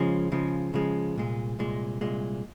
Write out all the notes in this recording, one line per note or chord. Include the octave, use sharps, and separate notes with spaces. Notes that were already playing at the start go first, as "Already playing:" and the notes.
Already playing: C#3 F3 G#3
C#3 F3 G#3
C#3 F3 G#3
C2 A#2 G#3
C2 A#2 G#3
C2 A#2 G#3